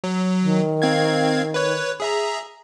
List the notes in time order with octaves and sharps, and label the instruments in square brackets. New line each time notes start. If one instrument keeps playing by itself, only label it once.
[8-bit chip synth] F#3
[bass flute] D#3
[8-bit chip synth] C4 F5 G#6
B4 C#5
G#4 E5 A#5